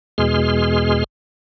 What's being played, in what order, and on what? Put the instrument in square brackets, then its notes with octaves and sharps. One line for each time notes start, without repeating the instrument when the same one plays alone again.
[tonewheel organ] E2 B2 G#3 G#4 C6 F6